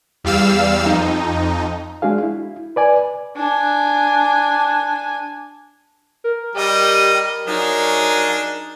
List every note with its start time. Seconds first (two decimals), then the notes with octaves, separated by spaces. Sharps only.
0.24 E2 G3 F5 E6
0.85 F2 D#4
2.02 G#3 D4 F#4 G#4 F5
2.23 E4
2.76 B4 D5 G#5
3.37 D4 G#5
6.24 A#4
6.55 G3 G4 D#5
7.47 F#3 D4 D#4 G#4